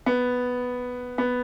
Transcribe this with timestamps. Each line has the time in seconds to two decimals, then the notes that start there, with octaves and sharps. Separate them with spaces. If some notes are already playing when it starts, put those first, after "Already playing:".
0.06 B3
1.18 B3